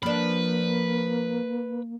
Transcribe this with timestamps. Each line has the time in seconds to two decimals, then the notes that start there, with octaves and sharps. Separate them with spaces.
0.03 F3 A#3 D4 B4